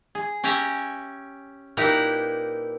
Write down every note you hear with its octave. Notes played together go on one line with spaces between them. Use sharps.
G#4
C#4 G4 E5 G#5 A#5
A#2 D#4 E4 G4 B4 A#5